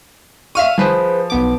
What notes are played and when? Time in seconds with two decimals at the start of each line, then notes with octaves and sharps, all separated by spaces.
0.55 E5 F5 C#6 F6 D#7
0.78 F3 G#4 B4 C5
1.30 B1 B3 D6